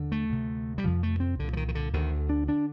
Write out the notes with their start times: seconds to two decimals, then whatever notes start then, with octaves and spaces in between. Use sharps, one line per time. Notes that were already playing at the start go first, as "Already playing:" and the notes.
Already playing: D#2 D3
0.12 A3
0.30 D2 C3
0.78 G3
0.84 F2 C3 F3
1.03 A3
1.20 C4
1.39 C2 A#2 D3
1.53 F3
1.57 D#3
1.68 D#3
1.75 D3
1.93 D2 D3 D#3
2.29 D4
2.48 D3 D4